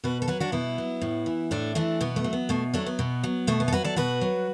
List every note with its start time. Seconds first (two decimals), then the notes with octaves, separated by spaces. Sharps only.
0.04 B2 F#4 B4
0.22 A4
0.28 F#3 F#4 B4
0.40 D4 F#4
0.52 B2 B3 E4
0.78 F#3
1.01 A2
1.26 E3
1.51 A2 A3 D4
1.75 E3 A3 D4
2.01 B2 B3
2.16 A3
2.24 F#3
2.33 B3
2.49 B2 A3
2.74 F#3 A3 D4
2.86 B3
2.99 B2
3.23 F#3
3.47 B2 A3
3.60 B3
3.68 A4
3.72 F#3 F#4 B4
3.84 A4 D5
3.96 B2 F#4 B4
4.21 F#3